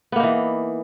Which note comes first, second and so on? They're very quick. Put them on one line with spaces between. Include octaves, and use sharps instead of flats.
B3 A#3 D#4 E3